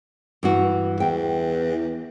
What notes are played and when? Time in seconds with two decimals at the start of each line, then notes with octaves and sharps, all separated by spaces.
0.43 G2 E3 F#4
1.00 E2 G5